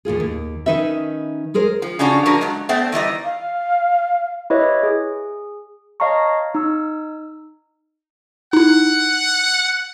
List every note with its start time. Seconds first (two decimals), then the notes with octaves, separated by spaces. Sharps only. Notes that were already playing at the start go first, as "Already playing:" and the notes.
0.05 D#2 A2 F4 G#4
0.20 D#2
0.66 D#3 C#4 D#4 B4 E5
1.54 G#3 G#4 A#4 C5
1.82 F3
1.99 C#3 F3 C#4 D4 F#4
2.25 F3 D4 F#4 G#4 A#4
2.41 F#3 G#3
2.69 A3 B3 C4 C5 D5
2.92 D#3 E3 G3 D#5
3.25 F5
4.50 E4 G4 B4 C#5 D#5 E5
4.83 G#4
6.00 C#5 D#5 F5 A5 A#5 C#6
6.55 D#4 E6
8.53 D#4 E4 F#5